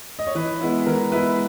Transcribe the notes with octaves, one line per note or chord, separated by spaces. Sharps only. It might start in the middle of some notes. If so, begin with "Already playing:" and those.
D#5
C#5
E3 B4
G#3 B3 E4
E3 A#4
G#3 B3 E4 B4